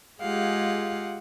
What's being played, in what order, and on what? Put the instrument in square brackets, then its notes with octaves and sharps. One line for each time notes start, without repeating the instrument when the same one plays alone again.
[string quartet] G#3 F4 G4 G#4 F5 F#5